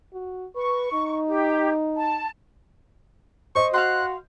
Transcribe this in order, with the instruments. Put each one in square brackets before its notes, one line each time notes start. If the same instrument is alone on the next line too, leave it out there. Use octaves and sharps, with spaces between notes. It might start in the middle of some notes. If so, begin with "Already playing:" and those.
[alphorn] F#4
[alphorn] B4 [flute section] C#6
[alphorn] D#4
[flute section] G4
A5
[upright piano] C5 D#5 [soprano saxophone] C#6
[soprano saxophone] F#4 [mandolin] F5 F#5 C6 [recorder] F#6